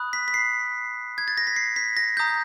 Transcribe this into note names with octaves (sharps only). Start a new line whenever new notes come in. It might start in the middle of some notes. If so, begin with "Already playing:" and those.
Already playing: B5 D#6 F#6
B6
B6
C7
G#6
A6
A#6
B6
C7
B6
A#6
A#5 D#6 G6